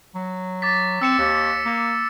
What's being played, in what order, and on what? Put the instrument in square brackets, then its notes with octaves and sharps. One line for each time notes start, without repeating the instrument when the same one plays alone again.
[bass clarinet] F#3
[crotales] D6 A6 B6
[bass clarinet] C4 [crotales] E6 C#7 E7
[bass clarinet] D#2
A#3